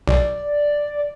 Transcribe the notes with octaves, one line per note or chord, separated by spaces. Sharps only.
B1 D5